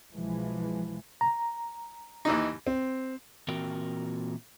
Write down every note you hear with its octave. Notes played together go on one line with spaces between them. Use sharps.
B1 E3 F3 G#3
A#5
D#2 E3 D#4
C4
A#2 E3 C4 F#4 A#4 G5